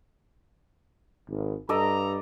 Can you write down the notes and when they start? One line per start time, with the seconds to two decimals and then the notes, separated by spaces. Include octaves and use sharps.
1.29 G#1
1.69 G2 A4 D5 D#5 A#5